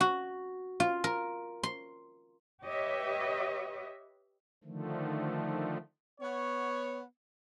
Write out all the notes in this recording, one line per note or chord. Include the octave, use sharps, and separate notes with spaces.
F#4
F4
A#4
C6
G4 B4 C#5 D#5 E5
D3 D#3 F3 A3
B3 C#5